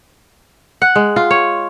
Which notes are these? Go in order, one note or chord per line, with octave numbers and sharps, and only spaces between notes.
F#5
G#3
F4
C#5